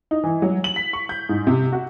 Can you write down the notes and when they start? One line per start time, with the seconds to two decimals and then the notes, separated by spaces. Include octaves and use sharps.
0.11 D#4
0.24 E3
0.42 F#3
0.64 F#7
0.76 B6
0.93 C#6
1.09 G6
1.29 G#2
1.47 C3
1.72 F#4